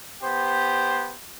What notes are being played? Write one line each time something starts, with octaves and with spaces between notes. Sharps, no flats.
B3 G4 C5